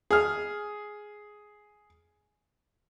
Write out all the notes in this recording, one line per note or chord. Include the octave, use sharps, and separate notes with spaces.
G#4 F6